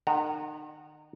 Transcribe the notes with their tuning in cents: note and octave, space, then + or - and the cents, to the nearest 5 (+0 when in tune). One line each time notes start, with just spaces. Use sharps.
D#3 -35 F#5 +0 A#5 -20